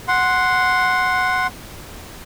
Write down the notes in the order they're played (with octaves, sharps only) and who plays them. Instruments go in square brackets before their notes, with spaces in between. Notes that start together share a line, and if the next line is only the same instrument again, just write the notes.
[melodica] F#5 C6